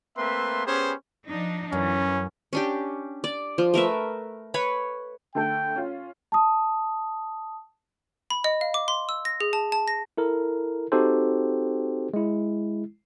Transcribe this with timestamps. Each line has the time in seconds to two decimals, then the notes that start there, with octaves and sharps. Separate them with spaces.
0.17 A3 A#3 C4 B4 E5 C6
0.66 B3 C#4 G4 G#4 B4 C5
1.28 F3 D4 D#4
1.73 F#2 E3 C#4
2.53 C#4 D4 G4
3.24 D5
3.58 F3
3.74 A3 A#4 B4 E5
4.54 B4 C#5 B5
5.35 D3 A3 A4 G5
5.76 C#4 F4
6.32 A5 D#6
8.30 B5
8.44 D#5
8.61 F5
8.74 D6
8.88 C6
9.09 E6
9.25 A#6
9.41 G#4
9.53 A5
9.72 A5
9.88 A#6
10.18 E4 A4 A#4
10.92 C4 D#4 F#4 G4 A4 C5
12.14 G#3 E4